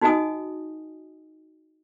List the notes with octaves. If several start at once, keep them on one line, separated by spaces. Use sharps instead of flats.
D#4 F#4 G#4 D#5 G#5 D#6